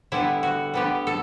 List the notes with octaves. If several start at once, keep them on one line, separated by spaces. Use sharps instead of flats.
D3 G3 B3 E4
F#4
D3 G3 B3 G4
A4